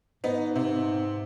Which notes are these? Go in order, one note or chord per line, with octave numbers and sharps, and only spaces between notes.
G#2 B3 D#4
C3